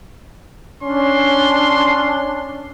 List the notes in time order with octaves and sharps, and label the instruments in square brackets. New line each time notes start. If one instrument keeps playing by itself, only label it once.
[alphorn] C#4 [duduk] D4 [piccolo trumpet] C6